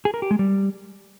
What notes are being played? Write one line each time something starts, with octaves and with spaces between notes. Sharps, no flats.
G#4
A#4
G4
G#3
G3